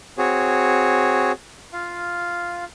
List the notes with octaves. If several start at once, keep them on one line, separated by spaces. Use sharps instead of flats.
C4 F#4 G#4 C#5
F4 F5